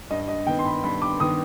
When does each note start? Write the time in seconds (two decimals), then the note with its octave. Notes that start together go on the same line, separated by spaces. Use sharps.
0.10 G2 D#5
0.28 D#5
0.47 D#3 B3 G5
0.59 C6
0.65 B5
0.83 G2 B5
1.02 D6
1.20 D#3 B3 D#6